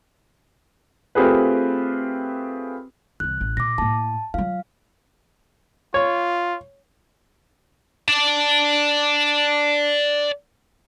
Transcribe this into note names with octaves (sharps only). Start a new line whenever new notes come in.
A3 C4 F4 G4 G#4 B4
C2 E3 F#6
A1
A#2 D6 A#6
A2 A#3 A5
F#3 F4 F5
F4 C#5
D5 A5